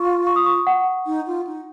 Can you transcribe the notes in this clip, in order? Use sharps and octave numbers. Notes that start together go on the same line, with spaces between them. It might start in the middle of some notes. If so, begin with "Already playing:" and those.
Already playing: F4 C#6
C#6
D#6
C#6
F#5
D#4
F4
D#4